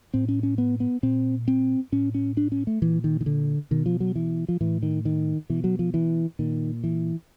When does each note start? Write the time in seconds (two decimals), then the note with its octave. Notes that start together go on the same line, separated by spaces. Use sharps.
0.14 A2 C4
0.28 C#4
0.43 C#4
0.58 B3
0.80 B3
1.03 A#2 C4
1.48 C4
1.92 A2 C#4
2.15 C#4
2.37 D4
2.52 C#4
2.67 A3
2.82 A#2 E3
3.04 D#3
3.21 D#3
3.26 D3
3.71 B2 D#3
3.86 F3
4.00 F#3
4.15 E3
4.49 F3
4.61 A2 E3
4.83 D#3
5.05 D#3
5.50 B2 E3
5.64 F#3
5.79 F3
5.94 E3
6.39 A#2 D#3
6.84 E3